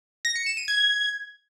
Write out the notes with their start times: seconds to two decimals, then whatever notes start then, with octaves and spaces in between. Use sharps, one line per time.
0.25 A#6
0.36 C#7
0.46 E7
0.57 D#7
0.68 G#6